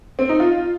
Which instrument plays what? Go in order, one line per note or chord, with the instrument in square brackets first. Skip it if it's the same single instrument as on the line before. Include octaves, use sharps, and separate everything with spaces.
[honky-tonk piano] C4
D#4
F4